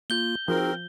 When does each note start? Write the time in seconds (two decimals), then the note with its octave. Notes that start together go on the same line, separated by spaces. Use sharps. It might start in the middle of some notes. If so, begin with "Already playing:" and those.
0.10 A#3 F4 G6 G7
0.48 F3 C4 D#4 F#4 G#4 A#4